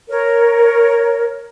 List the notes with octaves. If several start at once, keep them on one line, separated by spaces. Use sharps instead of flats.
A#4 C#5